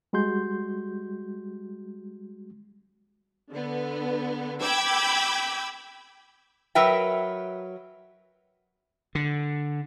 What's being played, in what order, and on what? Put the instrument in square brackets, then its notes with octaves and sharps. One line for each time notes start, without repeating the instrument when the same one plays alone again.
[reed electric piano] G3 G#3 F#4 C6 G6
[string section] D3 B3
G5 B5 D6 E6 G6 G#6
[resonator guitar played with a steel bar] F#3 A#4 B4 E5 G5
[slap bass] D3